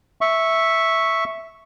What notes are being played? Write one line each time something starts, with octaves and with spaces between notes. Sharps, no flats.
E5 C#6